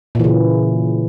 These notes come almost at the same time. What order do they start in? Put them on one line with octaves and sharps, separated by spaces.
A#2 E3 C#3